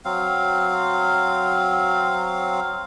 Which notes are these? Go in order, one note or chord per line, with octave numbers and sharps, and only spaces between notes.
F#3 C4 F5